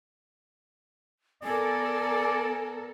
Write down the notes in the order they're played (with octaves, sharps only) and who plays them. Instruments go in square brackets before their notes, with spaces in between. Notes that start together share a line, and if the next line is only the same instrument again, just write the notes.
[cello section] B3 A4 A#4 [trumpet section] D5 [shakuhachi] G#5